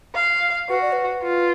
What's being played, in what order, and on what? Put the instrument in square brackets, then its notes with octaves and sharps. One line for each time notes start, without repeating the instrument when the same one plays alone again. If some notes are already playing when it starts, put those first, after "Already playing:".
[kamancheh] F5
[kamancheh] F#4 [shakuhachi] B4
[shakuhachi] D5
B4
[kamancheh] F4